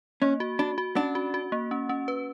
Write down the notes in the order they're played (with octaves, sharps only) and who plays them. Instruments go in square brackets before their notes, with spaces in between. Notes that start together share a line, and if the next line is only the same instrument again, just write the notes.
[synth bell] A#3 [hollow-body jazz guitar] C#4
[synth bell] F#4
[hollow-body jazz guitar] D4 [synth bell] F#4
[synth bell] F#4
[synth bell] C#4 [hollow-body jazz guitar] D4
[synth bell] F#4
F#4
A#3
C#4
C#4
B4